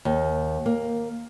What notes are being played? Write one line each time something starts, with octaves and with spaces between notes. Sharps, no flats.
D#2
A#3